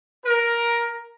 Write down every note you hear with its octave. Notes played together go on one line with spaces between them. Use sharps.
A#4